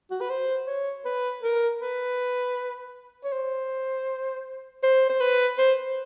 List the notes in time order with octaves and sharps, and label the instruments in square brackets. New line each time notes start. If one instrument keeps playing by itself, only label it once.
[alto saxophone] F#4
B4
C5
C#5
B4
A#4
B4
C#5
C5
C5
C5
B4
C5